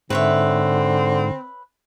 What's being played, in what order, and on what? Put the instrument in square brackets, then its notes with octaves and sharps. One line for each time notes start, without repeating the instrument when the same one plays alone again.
[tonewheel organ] G#2 [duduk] D3 [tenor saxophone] C4 [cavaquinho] B4 C#5 E5